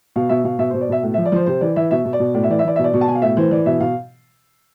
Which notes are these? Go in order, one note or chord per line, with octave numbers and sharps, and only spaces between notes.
B2 F5
B2 E5
B2 F5
B2 E5
B2 C5
D5
B2 E5
A2
F3 E5
D5
F3 C5
C3 C5
E3 D5
E3 E5
B2 E5
B2
D5
B2
A2 D5
E5
E3 D5
E5
E3 D5
B2 E5
D5
B2
A5
B2 G#5
F5
A2 E5
E3 C5
E3 D5
B2 E5
B2 F5